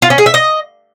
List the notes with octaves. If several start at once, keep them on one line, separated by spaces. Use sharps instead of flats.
F4
C#4
G#4
E5
D#5